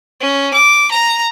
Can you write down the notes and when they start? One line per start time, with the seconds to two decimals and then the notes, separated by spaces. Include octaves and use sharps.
0.20 C#4
0.53 D6
0.91 A#5